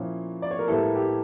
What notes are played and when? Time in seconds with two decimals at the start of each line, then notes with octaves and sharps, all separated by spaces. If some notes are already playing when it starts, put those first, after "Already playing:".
Already playing: A#2 F3 C#4 E4
0.42 D5
0.51 C#5
0.59 A#4
0.68 A2 E3 G3 A#3 E4 A4
0.96 G4